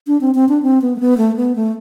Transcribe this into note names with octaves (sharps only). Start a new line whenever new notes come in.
D4
C4
C4
D4
C4
B3
A3
B3
A3
B3
A3